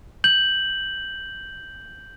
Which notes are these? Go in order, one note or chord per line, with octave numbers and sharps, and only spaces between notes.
G6 F#7